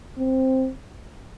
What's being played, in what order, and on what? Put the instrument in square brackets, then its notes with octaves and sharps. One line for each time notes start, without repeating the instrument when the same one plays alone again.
[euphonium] C4